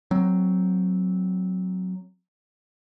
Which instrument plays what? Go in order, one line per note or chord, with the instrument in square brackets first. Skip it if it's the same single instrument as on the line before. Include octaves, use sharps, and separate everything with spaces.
[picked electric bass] F#3 C4